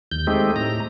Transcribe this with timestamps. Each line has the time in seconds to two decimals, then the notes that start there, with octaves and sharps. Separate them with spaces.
0.11 D#2 G6
0.27 G#3 A3 C4 D#4 G4
0.56 A2 A#5